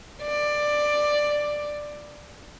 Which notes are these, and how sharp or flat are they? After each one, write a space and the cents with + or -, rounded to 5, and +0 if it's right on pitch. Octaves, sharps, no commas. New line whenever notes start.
D5 +10